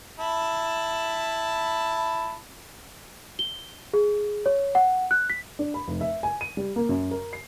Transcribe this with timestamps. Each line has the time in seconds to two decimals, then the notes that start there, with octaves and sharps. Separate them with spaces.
0.20 E4 A5 B5
3.39 G7
3.93 G#4
4.46 C#5
4.75 F#5
5.11 F#6
5.30 B6
5.59 D4
5.74 B5
5.88 F1
6.01 E5
6.23 G#5
6.41 D#7
6.57 G3
6.76 A#3
6.89 F#2
7.11 A#4
7.33 C7